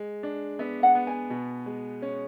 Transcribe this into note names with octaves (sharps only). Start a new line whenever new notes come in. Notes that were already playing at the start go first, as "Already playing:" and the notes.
Already playing: G#3
D4
B3 E5
F#5
B3
G#5
B2
G#3
C#4